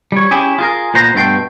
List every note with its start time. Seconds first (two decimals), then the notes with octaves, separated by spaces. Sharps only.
0.12 G3 C#5
0.31 C#4 E4 G4 G#4
0.58 F4 G#4 A#4
0.94 A#2 B3 C5 A#5
1.14 G2 B2 A3 D#4 G5 C6